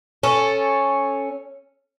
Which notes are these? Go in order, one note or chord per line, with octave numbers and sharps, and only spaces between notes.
C#4 A4